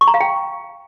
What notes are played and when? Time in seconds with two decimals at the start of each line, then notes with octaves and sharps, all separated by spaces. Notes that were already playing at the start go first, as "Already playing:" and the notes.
0.01 C#6
0.08 A#5
0.14 F5
0.21 G5